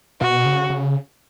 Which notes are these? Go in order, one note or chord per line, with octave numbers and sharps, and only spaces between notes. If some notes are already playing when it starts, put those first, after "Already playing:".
B2 F#4
C#3
C#3